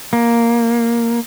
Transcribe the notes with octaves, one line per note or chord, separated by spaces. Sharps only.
A#3